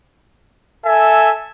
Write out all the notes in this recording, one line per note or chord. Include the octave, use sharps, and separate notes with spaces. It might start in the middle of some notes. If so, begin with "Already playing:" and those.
A4 E5 G#5